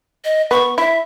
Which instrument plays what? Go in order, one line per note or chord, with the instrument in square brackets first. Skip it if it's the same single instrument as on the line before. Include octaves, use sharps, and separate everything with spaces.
[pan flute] D#5
[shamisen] B3 [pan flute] C#6
[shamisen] E4 [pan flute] E5